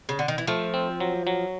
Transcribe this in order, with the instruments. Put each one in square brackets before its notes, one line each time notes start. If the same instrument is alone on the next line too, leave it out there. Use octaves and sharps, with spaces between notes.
[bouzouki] C#3
D3
D#3
E3
[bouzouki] F3 [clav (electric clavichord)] A3
[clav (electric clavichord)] C4
F#3
F#3